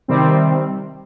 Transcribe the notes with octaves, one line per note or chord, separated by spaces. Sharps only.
C3 D#3 G3 C4